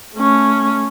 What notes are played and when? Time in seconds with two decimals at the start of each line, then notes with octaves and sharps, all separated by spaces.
0.16 A3 C#4